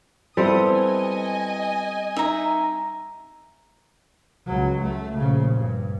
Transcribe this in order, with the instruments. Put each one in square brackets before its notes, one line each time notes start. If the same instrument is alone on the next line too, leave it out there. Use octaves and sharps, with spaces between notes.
[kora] G3 C4 [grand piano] B3 E4 A4 [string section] D#6
[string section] D#5 G#5
[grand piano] D#4 [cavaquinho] E5 A#5
[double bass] C#2 F#3
A3
A#1 C#3
G2